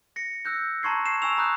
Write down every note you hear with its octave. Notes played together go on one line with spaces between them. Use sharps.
A#6 C#7
E6 F#6 G6 A#6
A5 A#5 C6 C#6 G#6 C7
C7 E7
G#5 C#6 E6 F7
A#5 B5 D#6 F#6 G6